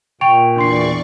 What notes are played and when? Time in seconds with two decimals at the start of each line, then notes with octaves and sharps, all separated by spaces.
0.21 A#2 G5 C#6 D7 F7
0.56 E2 D4 D5 C6 C#6 C7